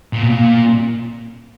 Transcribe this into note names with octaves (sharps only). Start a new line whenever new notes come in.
A#2
B2
A#2